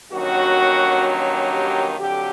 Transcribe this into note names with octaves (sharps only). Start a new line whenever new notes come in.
G2 D#3 F#3 A#3 C#4 F#4
G4
F2 D3 F#3 G4